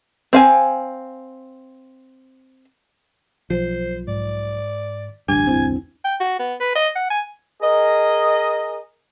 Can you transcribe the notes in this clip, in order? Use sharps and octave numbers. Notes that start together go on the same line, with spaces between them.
C4 F5 G#5
B1 F3 C5
G#2 D5
A1 D2 G2 D4 G#5
E2 C4 E4 G#6
G5
F#4
B3
B4
D#5
F#5
G#5
G#4 A#4 D#5